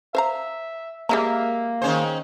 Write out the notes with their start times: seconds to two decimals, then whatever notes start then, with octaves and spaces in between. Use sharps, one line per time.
0.15 C5 E5 F5 A#5
1.09 G3 G#3 A#3 E5 A#5
1.82 D#3 C#4 G#4 C5